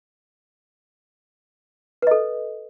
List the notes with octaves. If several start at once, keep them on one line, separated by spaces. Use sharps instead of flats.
A4 B4 D#5